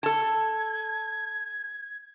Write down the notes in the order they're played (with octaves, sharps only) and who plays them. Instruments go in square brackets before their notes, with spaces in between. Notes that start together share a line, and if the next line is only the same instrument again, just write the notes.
[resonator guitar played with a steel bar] A4 A5 [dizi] G#6